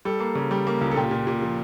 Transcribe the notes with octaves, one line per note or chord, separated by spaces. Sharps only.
G3 A4
A#3
C#3
G3
A#3
C#2
A4
A#2 G4
A#2
A#2
F3